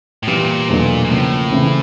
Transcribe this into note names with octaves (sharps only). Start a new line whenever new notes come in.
A2
A#2 E3 G3 B3 E4
E2 B2 F#3 A3 D4
A#2
A2 C#3 F3 A#3
C#3 E3 A3 C4 E4